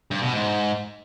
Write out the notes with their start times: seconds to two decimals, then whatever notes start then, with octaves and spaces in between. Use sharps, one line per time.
0.11 G2
0.22 B2
0.33 G#2